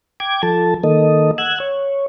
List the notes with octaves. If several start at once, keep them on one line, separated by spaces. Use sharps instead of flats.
G5 D6 G#6
F3 A4 A5
D#3 A#3 A4 D#5
F#5 E6 F#6 G#6
C#5